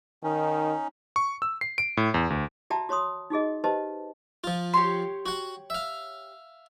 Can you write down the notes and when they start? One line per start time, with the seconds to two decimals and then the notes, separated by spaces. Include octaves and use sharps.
0.23 D#3 C#4 D#4
1.16 C#6
1.42 E6
1.61 C7
1.78 D7
1.97 A2
2.14 E2
2.30 D2
2.70 F#4 D5 E5 G5 A5 A#5
2.89 F#4 C#5 B5 C6 D#6
3.30 D#4 F#4 G#4 D#5
3.64 G4 B4 C5 D#5 A5
4.44 F3 F4
4.74 G4 C#5 C6
5.26 F#4 F#5
5.70 E5 F5